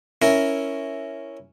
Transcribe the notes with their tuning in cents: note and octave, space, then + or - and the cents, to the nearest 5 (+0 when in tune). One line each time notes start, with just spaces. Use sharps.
C#4 +0 E4 +0 A#4 +0